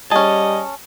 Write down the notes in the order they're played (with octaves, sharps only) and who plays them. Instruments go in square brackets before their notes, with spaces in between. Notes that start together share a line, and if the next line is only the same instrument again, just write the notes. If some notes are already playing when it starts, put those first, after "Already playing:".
[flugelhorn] G3 [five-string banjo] C#4 G#4 [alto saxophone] D#5 [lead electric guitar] A5